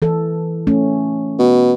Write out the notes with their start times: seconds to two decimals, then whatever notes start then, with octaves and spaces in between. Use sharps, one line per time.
0.02 E3 A4
0.67 A3 C#4
1.39 B2